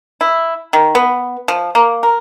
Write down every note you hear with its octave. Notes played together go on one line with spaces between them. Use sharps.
E4
D#3
B3
F3
A#3
A#4